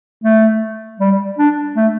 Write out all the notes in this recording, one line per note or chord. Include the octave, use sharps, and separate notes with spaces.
A3
G3
D4
A3